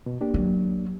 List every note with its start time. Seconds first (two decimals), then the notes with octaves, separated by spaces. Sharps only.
0.06 B2
0.21 A#3 D4 G4
0.34 F#3